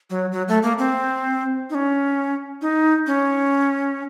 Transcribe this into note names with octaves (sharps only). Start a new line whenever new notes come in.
F#3
F#3
A3
A#3
C4
D#4
C#4
D#4
C#4